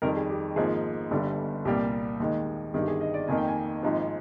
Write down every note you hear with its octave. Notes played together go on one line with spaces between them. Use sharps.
F2 D#3 G3 A#4
G#4
G4
G#1 G#2 F3 A#3 G#4
G1 G2 D3 G3
C2 A#2 G3 A#3 G4
D#2 D#3 G#3
G1 G2 D#3 G#4
G4
G#4
D#5
D5
F2 D#3 A#3 G#5
G5
G#5
G#1 G#2 F3